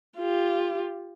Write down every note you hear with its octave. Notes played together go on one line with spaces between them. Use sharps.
F4 G4